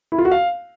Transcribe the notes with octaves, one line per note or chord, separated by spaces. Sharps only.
E4
F4
F#4
F5